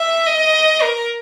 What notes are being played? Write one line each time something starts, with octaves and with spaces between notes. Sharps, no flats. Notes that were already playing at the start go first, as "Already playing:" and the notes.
Already playing: E5
D#5
A#4